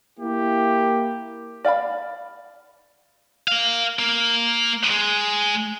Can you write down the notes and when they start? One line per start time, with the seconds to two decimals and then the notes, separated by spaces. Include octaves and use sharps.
0.19 A#3 E4 G4
1.65 D5 F5 G5 B5
3.48 A#4 F5
3.99 A#3
4.91 G#3